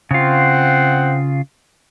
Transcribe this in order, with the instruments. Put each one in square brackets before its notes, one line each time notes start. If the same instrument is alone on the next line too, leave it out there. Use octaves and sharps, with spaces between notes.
[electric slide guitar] C#3 F4 [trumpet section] C4 F#5